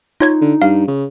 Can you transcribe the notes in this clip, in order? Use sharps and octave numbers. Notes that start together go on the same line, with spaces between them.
D#4 F4 C#5 G#6
D3
G2 F5
C#3